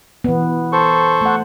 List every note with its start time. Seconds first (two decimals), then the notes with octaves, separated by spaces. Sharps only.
0.24 E3 B3
0.72 A4 C5 C#6
1.21 A3 F#5